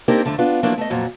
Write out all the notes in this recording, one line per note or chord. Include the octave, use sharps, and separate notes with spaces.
A#3 C4 D4 D#4 G4 A#4
F2 D3 A3
B3 D4 F4
F3 F#3 A#3 D4 E4
A3 D#5
F2 A#2 F#3